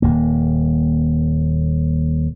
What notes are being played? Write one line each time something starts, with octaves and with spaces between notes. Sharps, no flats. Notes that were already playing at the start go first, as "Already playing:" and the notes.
D#1 A#3